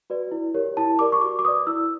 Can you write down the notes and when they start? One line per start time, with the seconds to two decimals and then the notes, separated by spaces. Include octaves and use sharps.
0.10 F#4 B4 D5
0.32 E4
0.54 G4 A#4 C#5
0.77 E4 A5
0.99 G4 A#4 D5 D6
1.12 C#6
1.21 F#4 D6
1.39 D6
1.45 B4 D5 D#6
1.67 E4 E6